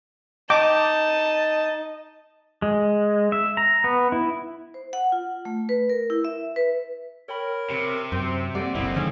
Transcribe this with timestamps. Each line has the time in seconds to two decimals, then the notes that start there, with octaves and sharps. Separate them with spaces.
0.50 D#4 D#5 G5 A5 D6
2.62 G#3
3.32 E5
3.57 A#5
3.84 B3
4.12 E4
4.74 C5
4.93 F#5
5.12 F4
5.45 A3
5.69 B4
5.89 A#4
6.10 E4
6.25 E5
6.56 B4
7.29 A#4 C#5 G5 B5
7.70 C3
8.12 F#2 C4 C6
8.55 G3 A#3 A4 D5 F#5
8.75 F#1 B1 F3 C4 E4
8.96 D3 D#3 G#3 C#4